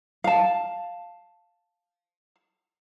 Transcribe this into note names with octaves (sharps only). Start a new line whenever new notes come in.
F5 A5